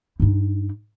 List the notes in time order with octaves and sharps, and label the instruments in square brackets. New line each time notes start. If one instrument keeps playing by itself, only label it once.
[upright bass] G2 D#4